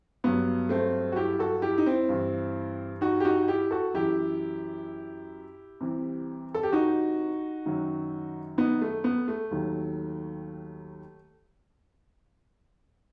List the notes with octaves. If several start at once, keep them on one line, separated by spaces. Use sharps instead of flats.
G2 F#3 B3
A3 C4
F#4
E4 G4
F#4 A4
E4 G4
D#4
C4 E4
G2 E3
D#4 F#4
G4
D#4 F#4
E4 G4
F#4 A4
F#2 E3 E4 G4
C2 C3 E3
A4
G4
D#4 F#4
F#2 D#3 F#3
B3 D#4
A3
B3
A3
D#2 D#3 F#3